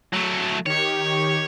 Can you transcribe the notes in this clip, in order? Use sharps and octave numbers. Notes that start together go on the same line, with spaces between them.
F#3 A3
D#3 G4 C#5